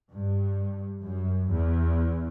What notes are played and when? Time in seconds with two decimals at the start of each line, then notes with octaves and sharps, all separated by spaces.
0.12 G2
1.01 F#2
1.49 E2